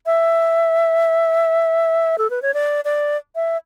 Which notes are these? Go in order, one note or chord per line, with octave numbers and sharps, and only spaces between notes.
E5
A4
B4
C#5
D5
D5
E5